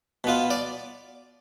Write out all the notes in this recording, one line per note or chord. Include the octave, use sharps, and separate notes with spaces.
B2 B3 F4
D5